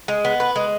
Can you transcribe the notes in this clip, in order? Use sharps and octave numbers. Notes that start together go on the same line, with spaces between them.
G#3
B3
B4
G#3